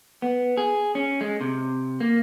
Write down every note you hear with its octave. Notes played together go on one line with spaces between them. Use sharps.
B3
G#4
C#4
G#3
C3
A#3